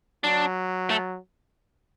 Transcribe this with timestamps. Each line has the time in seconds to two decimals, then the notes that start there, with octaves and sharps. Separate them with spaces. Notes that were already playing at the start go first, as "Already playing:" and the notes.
0.24 F#3 D4
0.90 A3